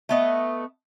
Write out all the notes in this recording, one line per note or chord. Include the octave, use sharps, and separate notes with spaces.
A3 B3 D#5